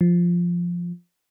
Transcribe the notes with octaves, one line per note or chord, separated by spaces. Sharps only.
F3